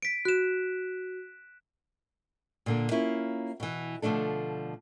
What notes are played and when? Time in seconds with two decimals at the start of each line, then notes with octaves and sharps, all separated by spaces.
0.02 B6 D7
0.25 F#4 F#6 E7
2.66 A#2 D3 A#3
2.91 A#3 C#4 E4 F4
3.60 B2 E3
4.02 B2 D3 F3 A3 D4 A4